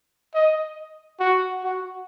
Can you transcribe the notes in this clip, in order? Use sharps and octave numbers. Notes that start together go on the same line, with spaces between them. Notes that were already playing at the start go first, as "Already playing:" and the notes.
D#5
F#4
F#4